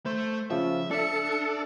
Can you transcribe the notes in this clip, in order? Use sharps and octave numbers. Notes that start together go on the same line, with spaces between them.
A3 C5
C#3 F3 E5
D4 A4 D5 E5 C#7